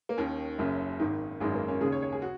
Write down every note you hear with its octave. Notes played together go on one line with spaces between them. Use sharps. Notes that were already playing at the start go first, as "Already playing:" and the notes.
A#3
D#2 D#3 C#4
F#1 F#2 C#3
G#1 G#2 D#3
G#1 F#2 D#3 G#3
A#3
C#4
D#2 C#3 G#4
C#5
C#5
G#4
F#4